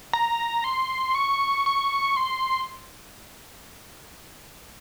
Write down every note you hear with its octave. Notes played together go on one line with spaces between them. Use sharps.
A#5
C6
C#6
C#6
C6